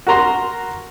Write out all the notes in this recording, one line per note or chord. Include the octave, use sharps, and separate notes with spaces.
F#4 A#4 A#5 C6